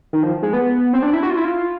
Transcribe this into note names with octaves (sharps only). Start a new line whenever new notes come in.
D#3
F3
G#3
B3
C4
D4
E4
F#4
F4
E4
F4